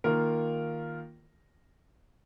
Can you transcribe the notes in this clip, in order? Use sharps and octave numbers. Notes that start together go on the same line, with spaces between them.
D#3 A#3 F4 A#4